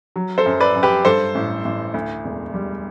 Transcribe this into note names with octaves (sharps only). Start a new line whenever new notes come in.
F#3
A4 C5
F#2
B4 D5
F#2
G4 B4
G2 A4 C5
A1
A1
D2
E1
G3